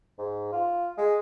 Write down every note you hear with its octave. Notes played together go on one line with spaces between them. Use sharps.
G#2
F4
G#3